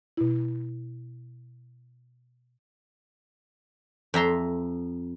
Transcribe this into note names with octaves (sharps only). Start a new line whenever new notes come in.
B2 E4
F2 E5 A#5 C6